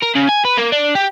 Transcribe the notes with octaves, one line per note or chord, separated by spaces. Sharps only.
A#4
C#3
G#5
B4
A#3
D4
G4